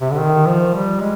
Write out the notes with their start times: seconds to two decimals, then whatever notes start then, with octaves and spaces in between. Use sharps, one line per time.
0.01 C3
0.11 D3
0.20 D#3
0.46 F3
0.74 G3
1.00 G#3